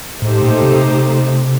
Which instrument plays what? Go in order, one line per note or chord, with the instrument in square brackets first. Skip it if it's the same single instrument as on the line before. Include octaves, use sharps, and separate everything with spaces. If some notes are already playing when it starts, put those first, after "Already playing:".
[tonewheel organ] A2 [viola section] A3 D#4 G4 C5
[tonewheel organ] A#2
C3